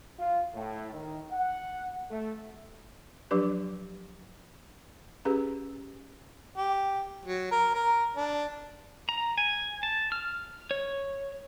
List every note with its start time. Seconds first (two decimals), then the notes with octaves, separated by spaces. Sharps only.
0.19 F4
0.54 A2
0.93 D#3
1.31 F#5
2.10 A3
3.31 F3 F#3 D4 G4 B4
5.25 C#4 G4 G#4 B4
6.57 G4
7.25 F#3
7.51 A#4
7.74 A#4
8.17 D4
9.09 A#5
9.38 G#5
9.83 A5
10.12 F6
10.71 C#5